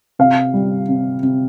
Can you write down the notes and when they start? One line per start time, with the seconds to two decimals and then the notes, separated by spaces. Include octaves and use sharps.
0.19 C3 F5
0.54 G3
0.89 C3
1.23 C3